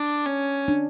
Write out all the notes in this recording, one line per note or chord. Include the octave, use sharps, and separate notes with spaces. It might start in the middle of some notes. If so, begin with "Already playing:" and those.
Already playing: D4
C#4
D4